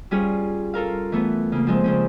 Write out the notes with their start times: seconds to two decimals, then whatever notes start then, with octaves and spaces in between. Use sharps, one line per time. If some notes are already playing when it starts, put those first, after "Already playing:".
0.11 G3 C#4 F4 G#4 C#5
0.74 F4 A4 A#4 F5
1.12 E3 A3 B3
1.52 C#3 A#3
1.67 F3 G#3 C4
1.84 C#3 C4 C#4